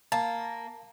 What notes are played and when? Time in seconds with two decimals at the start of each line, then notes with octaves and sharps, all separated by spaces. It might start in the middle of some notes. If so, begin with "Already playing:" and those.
0.12 A#3 A5